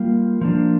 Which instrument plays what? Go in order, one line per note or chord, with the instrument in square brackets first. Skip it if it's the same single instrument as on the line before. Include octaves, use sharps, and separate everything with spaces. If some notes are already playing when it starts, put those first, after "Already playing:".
Already playing: [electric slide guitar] G3 A#3 F4
F3 A#3 D4